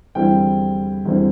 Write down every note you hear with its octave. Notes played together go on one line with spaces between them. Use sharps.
E2 D3 G3 C4 E4 G5
E2 D3 G3 C4 E4